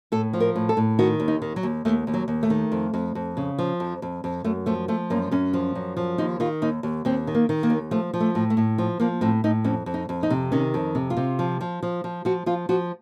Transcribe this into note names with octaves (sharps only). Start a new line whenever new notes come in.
A2 A4
F3
A#4
A2
A4
A2
D#3 F#4
D#2
D#4
D#3
F#3
D#2
D#2 A3
D#2
F#3
D#2
A3
D#3
F2
F2
F2
C#3
F3
F2
F2
F2
F#2 A3
F3 A3
F3 A3
F#2 A#3
F#2 C#4
F3
F#2
F3
D#2 D#4
D#3 F4
D#2 D#4
D#2
D#2 C4
D#3
A#3
D#3
A#3
D#2
F3 A3
F3
A3
A2
A3
A2
F3
F3 A#3
A2 C4
A2 D#4
F2 C#4
F2
D#4
F2
D#4
C3
D#3 C#4
F2
C3
F4
C3
F3
F3
F3
F3
F3 F#4
F3 F4
F3 F#4